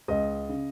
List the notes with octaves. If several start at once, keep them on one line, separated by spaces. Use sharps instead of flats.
C#2 D#5
C#3